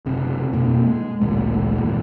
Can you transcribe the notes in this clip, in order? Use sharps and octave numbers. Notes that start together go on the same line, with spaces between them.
F#1 C3
F2 B2 A#3
G#3
A1 D2 A#2 G#3
G#1 F2 A#2